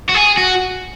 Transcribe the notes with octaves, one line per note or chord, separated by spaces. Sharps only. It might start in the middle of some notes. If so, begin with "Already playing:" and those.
F#4
G#4
F#4